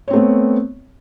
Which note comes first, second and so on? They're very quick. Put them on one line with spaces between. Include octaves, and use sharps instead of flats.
C#5 C4 A3 B3